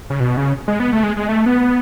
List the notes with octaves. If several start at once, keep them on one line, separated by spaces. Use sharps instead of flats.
C#3
B2
C#3
G#3
B3
A3
G#3
G#3
A3
B3